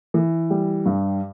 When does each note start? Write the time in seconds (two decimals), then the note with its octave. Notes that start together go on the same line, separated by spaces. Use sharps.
0.14 E3
0.50 G3
0.86 G2